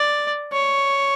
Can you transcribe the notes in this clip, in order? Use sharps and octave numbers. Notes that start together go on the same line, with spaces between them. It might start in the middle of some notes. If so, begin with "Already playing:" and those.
Already playing: D5
C#5